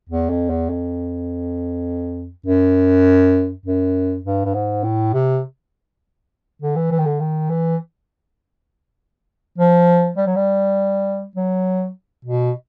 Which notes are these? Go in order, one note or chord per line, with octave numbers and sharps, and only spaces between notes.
E2
F2
E2
F2
F#2
F#2
G2
G2
G#2
A2
C3
D3
E3
E3
D#3
D3
D#3
E3
F3
G3
F#3
G3
F#3
B2